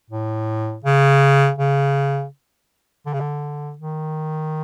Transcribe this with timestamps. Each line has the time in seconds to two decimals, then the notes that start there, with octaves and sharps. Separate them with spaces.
0.10 A2
0.85 C#3
1.59 C#3
3.06 D3
3.13 C#3
3.20 D3
3.78 D#3